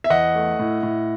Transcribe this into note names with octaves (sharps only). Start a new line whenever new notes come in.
E5
E2 D#5 F#5
A3
A2
A2